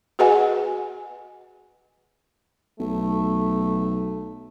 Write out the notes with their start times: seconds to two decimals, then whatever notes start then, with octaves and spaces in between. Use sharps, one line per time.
0.19 F#4 G#4 B4 D#5 F#5 G#5
2.80 B1 A3